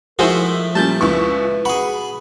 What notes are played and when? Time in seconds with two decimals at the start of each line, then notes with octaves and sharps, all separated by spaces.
0.19 F3 G#3 A3 E4 F#4 G#4 A#4 C5
0.75 A#2 G3 C#4 A5 G6 A6
1.01 C#2 E4 B4 C#6
1.65 F#4 G#4 B5